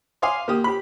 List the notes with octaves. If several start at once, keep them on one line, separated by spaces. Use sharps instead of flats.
F5 G#5 C6 D6 D#6
A#3 G4 D#6
G4 B5